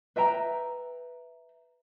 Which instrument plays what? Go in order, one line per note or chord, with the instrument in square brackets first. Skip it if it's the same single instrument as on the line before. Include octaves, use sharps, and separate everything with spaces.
[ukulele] B4 E5 G5 A#5